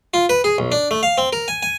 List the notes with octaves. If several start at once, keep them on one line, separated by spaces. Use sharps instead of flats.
F4
B4
G#4
B1
D4
A3
F5
C4
A#4
G#5
G#5